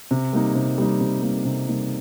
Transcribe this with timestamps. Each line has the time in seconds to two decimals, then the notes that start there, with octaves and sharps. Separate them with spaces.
0.11 C3
0.33 G3 A#3 D#4
0.55 C3
0.78 G3 A#3 D#4
1.01 C3
1.22 G3 A#3 D#4
1.45 C3
1.68 G3 A#3 D#4